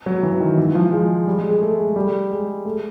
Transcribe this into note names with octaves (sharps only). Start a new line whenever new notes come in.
F#3
E3
D#3
E3
F3
G#3
G3
G#3
G#3
A3
G#3
G3
G#3
A3